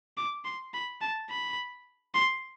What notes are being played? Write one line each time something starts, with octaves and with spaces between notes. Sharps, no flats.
D6
C6
B5
A5
B5
C6